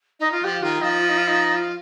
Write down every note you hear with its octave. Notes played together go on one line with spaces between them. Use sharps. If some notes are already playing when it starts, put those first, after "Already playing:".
D#4
F4
F3 G4
D#3 F4
F3 D#4
F4
D#4
F4
D#4
F4